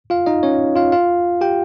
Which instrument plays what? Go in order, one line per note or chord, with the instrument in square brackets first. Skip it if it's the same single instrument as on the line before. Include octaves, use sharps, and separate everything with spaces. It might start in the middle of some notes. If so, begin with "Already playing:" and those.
[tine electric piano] F4 F5
D#4 D#5
C#4 C#5
F4 F5
F4 F5
G4 G5